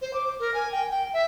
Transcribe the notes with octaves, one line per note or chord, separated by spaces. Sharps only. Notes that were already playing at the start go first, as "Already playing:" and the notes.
C5
D6
A#4
G#5
G5
G5
E5